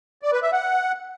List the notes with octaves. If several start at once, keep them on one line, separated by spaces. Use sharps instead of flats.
D5
B4
E5
F#5